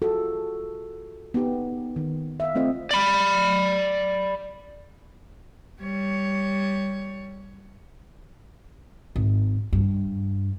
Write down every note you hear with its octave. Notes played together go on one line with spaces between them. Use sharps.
F4 F#4 G#4 A4
B3 D#4 G4
D#3
E5 F5
A3 C4 F4 D#5
D5 B5
G3 C#5
G#1
G2